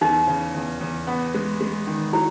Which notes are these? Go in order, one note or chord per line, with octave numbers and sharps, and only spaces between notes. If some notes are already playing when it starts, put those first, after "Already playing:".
E2 D#4
C#3
E2
E2
B3
G#3
G#3
D#3
F#3 E4